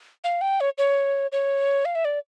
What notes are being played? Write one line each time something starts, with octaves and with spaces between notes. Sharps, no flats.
F5
G5
C#5
C#5
C#5
F5
E5
D5